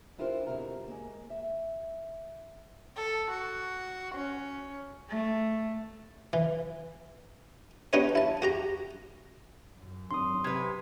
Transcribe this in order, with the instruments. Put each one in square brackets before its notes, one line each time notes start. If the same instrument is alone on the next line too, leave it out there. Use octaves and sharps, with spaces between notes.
[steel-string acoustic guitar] D4 E4 F4 G4 A#4 C5
B2 D3 G3 C4 F#4 A#4
G#3 A#3
E5
[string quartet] A4
F#4
C#4
A3
[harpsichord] E3
B3 D4 D#4 G4 B4 C#5
E4 A5
F#4 G4 A#5
[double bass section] F#2
[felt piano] G#1 F#3 [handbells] C6 D#6
[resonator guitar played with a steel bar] C3 B4 [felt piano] G#6